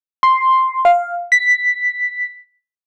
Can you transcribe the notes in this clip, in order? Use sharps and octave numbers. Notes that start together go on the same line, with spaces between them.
C6
F5
B6